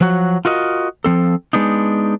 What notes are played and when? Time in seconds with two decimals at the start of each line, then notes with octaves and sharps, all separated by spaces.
0.01 F3 F#3 F#4
0.45 F4 F#4 A#4 D#5
1.04 F3 C4 A4
1.53 G#3 B3 D4 D#4